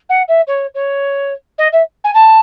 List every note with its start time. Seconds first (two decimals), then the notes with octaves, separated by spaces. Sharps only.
0.09 F#5
0.28 E5
0.47 C#5
0.74 C#5
1.58 D#5
1.72 E5
2.04 G#5
2.14 A5